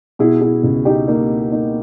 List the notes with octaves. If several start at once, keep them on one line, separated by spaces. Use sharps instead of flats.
B2 E4 G#4
E4 G#4
C#2
D#4 G4
A#3 D#4
A#3 D#4